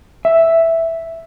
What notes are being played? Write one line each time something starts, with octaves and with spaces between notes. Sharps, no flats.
E5